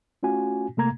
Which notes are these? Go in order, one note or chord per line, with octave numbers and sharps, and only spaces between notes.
A3 C#4 F4 F#4 G#5
C3 A3 A#3 A#5 G#6